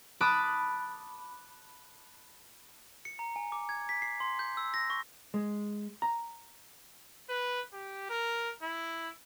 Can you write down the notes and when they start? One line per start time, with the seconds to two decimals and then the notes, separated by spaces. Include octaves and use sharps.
0.21 A5 B5 D6 D#6 F#6
3.05 C#7
3.19 A#5
3.36 G#5
3.52 D6
3.69 G#6
3.89 B6
4.02 C7
4.20 C6
4.39 G6
4.57 E6
4.74 A#6
4.90 C#6
5.34 G#3
6.02 A#5
7.29 B4
7.74 G4
8.10 A#4
8.63 E4